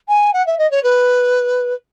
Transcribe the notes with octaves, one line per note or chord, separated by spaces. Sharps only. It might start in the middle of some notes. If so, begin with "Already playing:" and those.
G#5
F#5
E5
D#5
C#5
B4